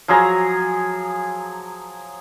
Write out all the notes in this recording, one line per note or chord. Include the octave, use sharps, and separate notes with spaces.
F3 F#3 G#4 A#5